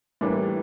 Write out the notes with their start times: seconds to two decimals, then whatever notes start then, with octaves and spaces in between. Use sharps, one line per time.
0.21 A2 E3 G3 A#3 D4